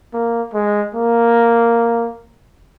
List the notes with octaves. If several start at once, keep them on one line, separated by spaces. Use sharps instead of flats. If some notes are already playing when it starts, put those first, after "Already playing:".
A#3
G#3
A#3